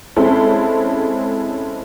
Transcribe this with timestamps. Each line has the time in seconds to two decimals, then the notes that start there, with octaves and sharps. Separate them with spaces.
0.16 G#3 C4 C#4 E4 A4